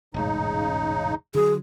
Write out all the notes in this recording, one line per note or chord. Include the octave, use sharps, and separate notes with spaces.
E1 A1 G#2 C#3 D#4
D3 E3 F#3 G#4